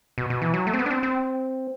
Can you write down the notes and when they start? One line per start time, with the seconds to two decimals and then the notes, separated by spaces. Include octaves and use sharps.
0.18 B2
0.30 B2
0.42 E3
0.54 F#3
0.67 A3
0.73 C4
0.79 B3
0.86 D4
0.91 C4
1.03 C4